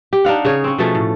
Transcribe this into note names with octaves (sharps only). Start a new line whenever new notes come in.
G4
D4 D#4 F5 F#5
C#3 G#4 C#5
C4 C#4
B2 F3 A3 G#4
A2